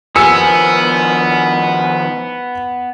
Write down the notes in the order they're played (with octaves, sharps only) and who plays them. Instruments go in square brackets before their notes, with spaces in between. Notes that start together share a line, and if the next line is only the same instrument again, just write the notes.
[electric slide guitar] D#3 F3 [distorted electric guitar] B3 [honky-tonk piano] G#5 E6 C#7